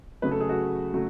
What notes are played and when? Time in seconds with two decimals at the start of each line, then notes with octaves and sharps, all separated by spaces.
0.22 C#3 F#3 A3 B4
0.31 A4
0.41 G#4
0.49 F#4
0.94 C#3 F#3 A3